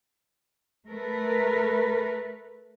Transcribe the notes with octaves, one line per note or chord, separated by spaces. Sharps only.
A3 A#4 B4